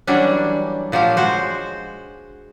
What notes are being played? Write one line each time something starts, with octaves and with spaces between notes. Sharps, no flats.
E3 F#3 G3 C#4 D4
A#2 F3 F#3 G4 F5
G#3 F#4 C5